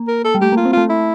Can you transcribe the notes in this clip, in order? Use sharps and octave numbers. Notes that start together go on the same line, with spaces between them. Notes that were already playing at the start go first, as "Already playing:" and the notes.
Already playing: A#3
A#4
A4
G3
A3 G4
A#3 F4
C4
A3 F4
E4